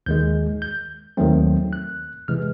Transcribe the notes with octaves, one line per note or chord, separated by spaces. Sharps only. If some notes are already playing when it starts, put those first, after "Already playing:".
D#2 D#3 G#3 G6
G6
D#2 D#3 F#3 A3 C4
F#6
C3 E3 G#3 F6